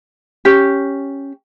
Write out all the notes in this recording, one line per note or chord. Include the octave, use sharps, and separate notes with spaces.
C#4 G4